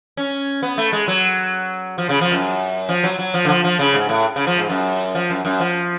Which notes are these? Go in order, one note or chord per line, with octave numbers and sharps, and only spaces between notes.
C#4
B3
A3
G#3
F#3
F3
C#3
F3
F#2
F3
F#3
F#3
F3
D3
F3
F3
C#3
G#2
A2
C#3
F3
G#2
F#2
F3
F#2
F#2
F3